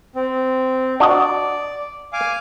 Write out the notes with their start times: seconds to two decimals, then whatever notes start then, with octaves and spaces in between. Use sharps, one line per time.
0.15 C4
1.00 D4 F#4 D5 D#5
2.13 F5 G#5 D6